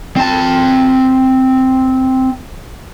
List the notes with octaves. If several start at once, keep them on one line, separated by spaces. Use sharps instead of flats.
C4 A5